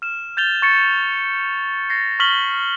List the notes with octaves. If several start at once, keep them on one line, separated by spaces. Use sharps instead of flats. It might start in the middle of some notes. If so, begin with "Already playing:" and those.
F6 E7
G6 A6 F7 G7
C#6 A6 C#7
A6 A#6 C7
C#6 F6 B6 F#7 G7